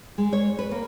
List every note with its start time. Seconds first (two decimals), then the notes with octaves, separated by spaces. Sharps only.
0.18 G#3
0.33 C#5
0.59 B4
0.71 A#3